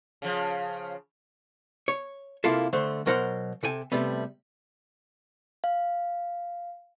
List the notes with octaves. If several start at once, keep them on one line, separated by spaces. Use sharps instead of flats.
C#3 F3
C#5
C3 A#3 E4 F4 A4
D3 A3 C5
B2 F#3 A#4 C5 F#5 C6
C3 A4 G5 G#5
C3 G3 A3 B3
F5